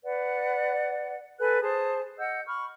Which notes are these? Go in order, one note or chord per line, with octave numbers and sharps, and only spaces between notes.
B4 D5 F#5
A4 B4 G#5 F#6
G#4 C5 A5 D#6
D#5 F#5 E6 G6
B5 C#6 F6